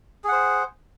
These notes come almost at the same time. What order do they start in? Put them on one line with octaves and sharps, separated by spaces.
G#4 F#5 C5